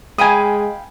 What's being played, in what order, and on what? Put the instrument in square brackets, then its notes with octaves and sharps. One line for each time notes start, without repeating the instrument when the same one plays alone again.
[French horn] G#3 [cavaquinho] F5 G5 B5 [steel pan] G#5 D#6